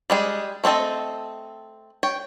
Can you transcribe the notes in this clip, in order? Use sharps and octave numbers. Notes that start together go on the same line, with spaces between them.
G3 G#3 G#4
A3 C4 D4 A4 D#5
C#5 G5